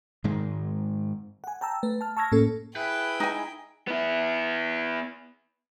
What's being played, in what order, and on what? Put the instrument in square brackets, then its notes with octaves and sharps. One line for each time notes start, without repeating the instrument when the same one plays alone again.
[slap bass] G#2 D#3 G#3
[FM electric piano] F#5 G#5
G5 A5 A#5 E6
A3 B4
A5 F6
A5 C#6 E6 F6 G#6 A#6
A2 A#3 C#4 A4
[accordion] E4 G#4 E5 [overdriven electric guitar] B4 [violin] G5
[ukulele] D#4 G#5
[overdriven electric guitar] B3 E4